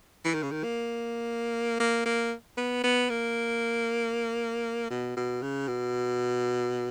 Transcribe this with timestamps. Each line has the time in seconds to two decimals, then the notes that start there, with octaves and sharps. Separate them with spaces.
0.24 E3
0.34 D#3
0.43 C#3
0.51 D#3
0.64 A#3
1.80 A#3
2.06 A#3
2.57 B3
2.84 B3
3.10 A#3
4.90 B2
5.17 B2
5.42 C#3
5.68 B2